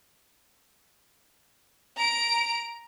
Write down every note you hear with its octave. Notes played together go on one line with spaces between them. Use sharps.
A#5 D7